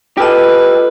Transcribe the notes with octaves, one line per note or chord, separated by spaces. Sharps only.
F4 G4 A4 B4 D#5